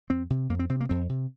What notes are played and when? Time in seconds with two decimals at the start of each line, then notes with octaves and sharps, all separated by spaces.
0.10 F2 C4
0.30 C3
0.49 F2 A#3
0.59 C4
0.69 C3 C4
0.81 A#3
0.89 F2 C4
1.09 C3